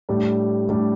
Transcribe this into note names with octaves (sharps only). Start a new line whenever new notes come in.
A2 G3 D4
A2 G3 D4